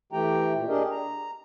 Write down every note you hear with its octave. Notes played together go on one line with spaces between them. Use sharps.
E3 A3 G4 G5 A#5
A#2
D4 G4 G#4 A#4 D#5
A#5